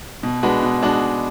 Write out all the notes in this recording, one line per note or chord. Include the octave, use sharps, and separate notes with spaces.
B2
G#3 D4 F#4 B4
B2
G#3 D4 F#4